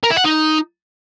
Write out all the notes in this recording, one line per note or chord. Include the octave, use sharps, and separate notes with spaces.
A#4
E4
F#5
D#4